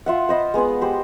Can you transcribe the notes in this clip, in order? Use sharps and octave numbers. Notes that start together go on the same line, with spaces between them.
F4 E5 F#5
C5 D#5 B5
G#3 B3 G#4 F#5
G4 C5 B5